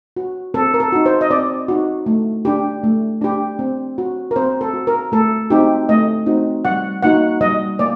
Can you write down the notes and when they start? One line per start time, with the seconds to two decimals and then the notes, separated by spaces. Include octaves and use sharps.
0.16 F#4
0.54 C4 A4
0.74 A#4
0.80 A4
0.92 D#4 F#4
1.06 C5
1.21 D#5
1.30 C4 D5
1.68 D#4 F#4
2.06 A3
2.45 D4 G4
2.84 A3
3.21 D4 G4
3.59 C4
3.98 F#4
4.31 A#4
4.36 C4 C5
4.61 A4
4.74 F#4
4.87 A#4
5.12 A3 A4
5.50 C4 D#4 F#4 G4
5.89 A3 D#5
6.26 C4 D#4 F#4
6.65 G3 F#5
7.03 A#3 D#4 F#4 F#5
7.41 G3 D#5
7.79 A#3 D5